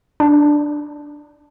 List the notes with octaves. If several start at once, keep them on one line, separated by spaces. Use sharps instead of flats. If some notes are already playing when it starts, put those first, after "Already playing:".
D4